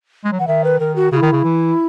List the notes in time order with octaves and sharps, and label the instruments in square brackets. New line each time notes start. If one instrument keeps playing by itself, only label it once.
[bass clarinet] G#3
F#3
[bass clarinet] E3 [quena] F#5
[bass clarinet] D#3 [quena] E5
[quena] B4
[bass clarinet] D#3 [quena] A#4
[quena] F#4
[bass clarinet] C#3 [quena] F#4
[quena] E4
[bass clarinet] D#3
C#3
E3